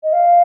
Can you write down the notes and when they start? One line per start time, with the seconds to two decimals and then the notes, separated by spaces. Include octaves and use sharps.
0.03 D#5
0.12 F5